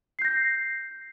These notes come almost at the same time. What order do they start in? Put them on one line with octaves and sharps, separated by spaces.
C7 G6 A#6